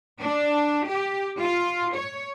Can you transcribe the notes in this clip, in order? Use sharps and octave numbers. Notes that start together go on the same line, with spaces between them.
D4
G4
F4
C#5